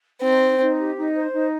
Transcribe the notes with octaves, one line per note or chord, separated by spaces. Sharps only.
C4 D#4
C5
D#4
G4
D#4
C5
D#4